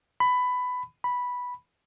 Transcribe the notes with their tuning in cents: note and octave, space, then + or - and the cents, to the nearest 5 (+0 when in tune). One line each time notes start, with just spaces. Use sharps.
B5 +15
B5 -5